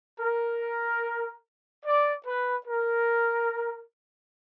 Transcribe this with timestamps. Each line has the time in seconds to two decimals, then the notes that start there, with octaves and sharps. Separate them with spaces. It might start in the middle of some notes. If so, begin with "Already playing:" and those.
0.20 A#4
1.85 D5
2.26 B4
2.67 A#4